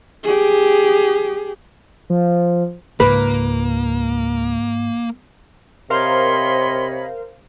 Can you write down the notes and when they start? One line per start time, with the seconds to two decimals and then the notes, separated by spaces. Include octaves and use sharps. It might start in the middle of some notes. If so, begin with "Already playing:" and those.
0.24 G4 G#4
2.10 F3
3.00 C#2 G#2 A#3 B4
5.90 C3 A#4 C5 C#5 D#5 F5 B5 C6